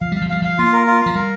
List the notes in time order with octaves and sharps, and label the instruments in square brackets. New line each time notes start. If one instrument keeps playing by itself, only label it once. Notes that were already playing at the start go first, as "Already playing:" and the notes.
[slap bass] F3 [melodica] F5
[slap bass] G3 [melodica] F5
[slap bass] F3
[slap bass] G3 [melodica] F5
[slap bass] F3 [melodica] F5
[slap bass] A#3 [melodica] F4
[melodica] A#4
F4
[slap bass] F3 [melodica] F5
[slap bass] G3 [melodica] A#4